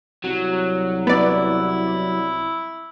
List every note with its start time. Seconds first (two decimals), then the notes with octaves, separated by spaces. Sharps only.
0.24 C2 F#3
1.07 B3 E4 D5